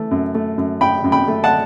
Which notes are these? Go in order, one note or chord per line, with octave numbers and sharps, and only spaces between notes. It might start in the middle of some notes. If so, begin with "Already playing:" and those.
Already playing: E3 A3
F#2
A3
F#2
F#2 G5 B5
F#2
G5 B5
A3
F#5 A5